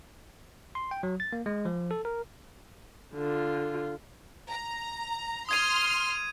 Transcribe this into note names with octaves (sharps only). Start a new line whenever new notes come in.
C6
G5
F#3
A6
A#3
G#3
F3
A4
A#4
D3 F4
A#5
C6 D#6 F6 G#6 D#7
D#7